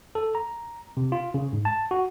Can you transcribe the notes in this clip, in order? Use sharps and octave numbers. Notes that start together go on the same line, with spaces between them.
A4
A#5
C3
F4
C#3
G#2
A5
F#4